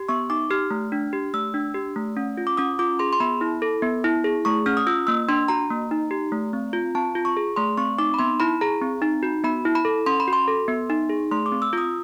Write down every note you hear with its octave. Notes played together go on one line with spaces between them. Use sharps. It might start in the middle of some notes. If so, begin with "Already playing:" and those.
Already playing: G4
B3 C#6
D#4 D6
G4 F6
A3
D4
G4
A3 E6
D4
G4
A3
C#4
F4
D6
C#4 D#6
F4 D6
G#4 C6
C6
B3 B5
E4
A4
B3
E4
G#4
A3 C#6
C#4 F6
D#6
F4 E6
A#3 E6
D4 C6
F#4 A#5
A#3
D#4
G4
A3
C4
F4
C4 A5
F4
C#6
G#4
A3 C6
C4 C#6
D#4 D6
B5
B3 C6
E4 B5
G#4 A#5
C4
D#4
F#4
B3 B5
E4
B5
A4
C#4 C6
B5
F#4
C6
A4
B3
D#4
G#4
A3 C6
D6
C4
E6
F4 D#6